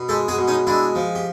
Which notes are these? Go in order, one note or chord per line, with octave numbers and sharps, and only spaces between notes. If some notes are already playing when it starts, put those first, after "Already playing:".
Already playing: B2
G#3 G4 A4
F#4 G#4
B2
C#4 D#4
G#3 D4 E4
F3
G4